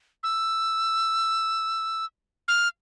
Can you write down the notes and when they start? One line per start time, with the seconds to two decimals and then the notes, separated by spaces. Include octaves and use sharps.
0.23 E6
2.48 F6